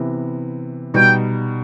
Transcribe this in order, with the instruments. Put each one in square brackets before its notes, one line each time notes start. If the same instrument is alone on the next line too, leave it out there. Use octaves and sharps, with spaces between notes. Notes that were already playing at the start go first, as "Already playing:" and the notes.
Already playing: [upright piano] C3 E3 B3
[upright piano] B2 G3 D#4 [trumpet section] G5